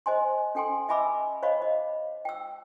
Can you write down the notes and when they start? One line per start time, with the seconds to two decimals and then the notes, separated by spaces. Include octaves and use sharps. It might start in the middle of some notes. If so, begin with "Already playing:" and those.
0.06 C5 D#5 G#5 C6
0.55 C#4 A4 G5 G#5 C6
0.89 D#5 E5 G#5 B5 D6 E6
1.42 C5 C#5 D#5 F5 B5
1.62 D#5
2.25 G5 E6